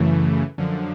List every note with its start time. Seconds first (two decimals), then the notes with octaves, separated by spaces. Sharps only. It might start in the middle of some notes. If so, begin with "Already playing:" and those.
Already playing: F#2 C#3 E3 A3
0.58 F#2 D3 F3